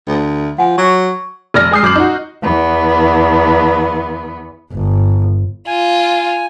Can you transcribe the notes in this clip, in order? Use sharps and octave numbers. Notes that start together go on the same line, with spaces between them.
D2
F3 F#5 G#5
F#3 C#6
F1 D5 F6 A#6
G#3 G#5 D#6 G6 C7
F#2 D6 G6 F#7
D#4 F#4
E2 B3
G1
F4 G#5